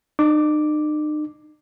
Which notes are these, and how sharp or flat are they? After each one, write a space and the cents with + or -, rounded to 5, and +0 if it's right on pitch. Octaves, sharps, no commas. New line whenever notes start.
D#4 -45 D6 +0